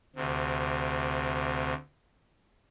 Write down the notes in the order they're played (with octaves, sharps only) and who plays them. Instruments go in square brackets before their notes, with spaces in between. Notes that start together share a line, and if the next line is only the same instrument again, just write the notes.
[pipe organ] D2 C3